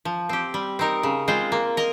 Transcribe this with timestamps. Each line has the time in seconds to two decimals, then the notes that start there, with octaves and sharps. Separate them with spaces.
0.05 F3
0.29 C4 G4
0.54 G3
0.79 C4 D#4 A#4
1.03 C#3
1.28 G#3 C4 F4 C5
1.52 A#3
1.77 A#4 D#5